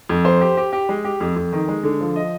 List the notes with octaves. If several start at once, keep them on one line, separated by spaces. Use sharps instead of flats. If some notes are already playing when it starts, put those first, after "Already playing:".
F2
C5
G4
G4
G4
G#3
G4
F2
F2
D#3
G#3
D3
F3
D#5